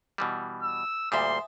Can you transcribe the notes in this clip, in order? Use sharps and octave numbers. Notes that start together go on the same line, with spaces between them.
B2 E3 G3
E6
D2 A#2 G3 E5 G#5 C6 D#6